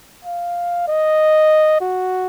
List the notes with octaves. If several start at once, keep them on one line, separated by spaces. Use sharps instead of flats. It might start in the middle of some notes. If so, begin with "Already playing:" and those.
F5
D#5
F#4